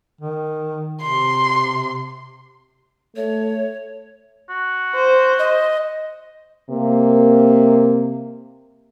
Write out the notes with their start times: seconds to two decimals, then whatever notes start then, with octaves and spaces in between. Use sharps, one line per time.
0.21 D#3
1.01 C3 C6
3.16 A3 C#5
4.49 F#4
4.95 C5
5.39 D#5
6.70 C3 A#3